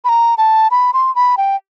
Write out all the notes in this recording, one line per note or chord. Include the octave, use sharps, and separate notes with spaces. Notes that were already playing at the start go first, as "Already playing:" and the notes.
B5
A#5
A5
B5
C6
B5
G5